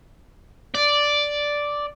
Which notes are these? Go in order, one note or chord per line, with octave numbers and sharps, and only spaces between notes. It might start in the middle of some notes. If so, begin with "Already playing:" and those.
D5